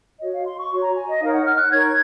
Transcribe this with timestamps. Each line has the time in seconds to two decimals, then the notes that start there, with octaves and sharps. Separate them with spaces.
0.20 F#4 C#5 D#5
0.33 F5
0.45 C6
0.58 C#6
0.70 F#4 C#5
0.82 A#5
0.96 G#5
1.08 D#5
1.21 D#4 A#4 C#5 F5
1.33 F#5
1.46 F6
1.58 F#6
1.71 D#4 A#4 C#5 G#6